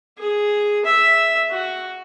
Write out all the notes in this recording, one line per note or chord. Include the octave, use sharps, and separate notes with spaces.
G#4
E5
F#4